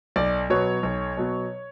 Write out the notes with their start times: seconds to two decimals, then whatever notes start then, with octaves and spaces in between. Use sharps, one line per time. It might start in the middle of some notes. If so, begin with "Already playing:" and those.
0.16 B1 D5
0.50 B2 F#3 B3 C#5
0.83 B1
1.17 B2 F#3 B3